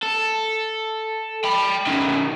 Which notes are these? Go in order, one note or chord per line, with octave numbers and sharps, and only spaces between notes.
A4
G5 B5
F#2 D#3